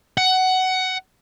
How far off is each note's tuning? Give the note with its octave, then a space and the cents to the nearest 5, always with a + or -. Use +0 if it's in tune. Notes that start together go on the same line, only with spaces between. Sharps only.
F#5 +15